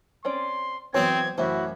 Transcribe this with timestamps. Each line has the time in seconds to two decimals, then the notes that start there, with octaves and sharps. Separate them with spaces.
0.25 C4 C#4 D5 C6
0.94 E3 F#3 B3 C4 C#5 G#6
1.38 A1 F#2 E4 F#4 C5 E5